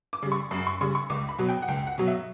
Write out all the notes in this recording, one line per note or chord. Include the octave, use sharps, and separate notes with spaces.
D6
C#3 G3
C#6
F#2 B5
C#6
C#3 G3 C#6
C#6
C#2 D6
B5
B2 F#3
G5
F#5
C#2 G5
F#5
B2 F#3
E5